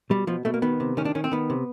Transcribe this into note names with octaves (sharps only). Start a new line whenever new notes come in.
B2 G3
B2 F3
B2 A3
A#3
D#3 B3
C3
D#3 C#4
D4
D#3 C#4
C4
D#3 B3
C3